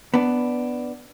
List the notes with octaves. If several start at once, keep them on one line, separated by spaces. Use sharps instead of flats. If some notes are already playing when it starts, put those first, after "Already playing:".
B3 D4